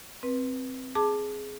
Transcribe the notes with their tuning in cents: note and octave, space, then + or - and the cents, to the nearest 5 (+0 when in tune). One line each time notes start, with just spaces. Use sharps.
C4 +0 B4 -15
G#4 +10 A5 +0 D6 +15